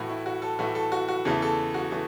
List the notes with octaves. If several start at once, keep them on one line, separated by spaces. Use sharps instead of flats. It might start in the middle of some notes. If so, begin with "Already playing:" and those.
Already playing: A2 E3 A3 F#4
E4
F#4
A4
A2 E3 A3 F#4
A4
F#4
F#4
E2 C#3 E3 A3 A4
A4
F#4
E3 A3